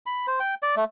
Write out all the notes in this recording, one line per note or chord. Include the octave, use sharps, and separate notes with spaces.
B5
C5
G5
D5
A3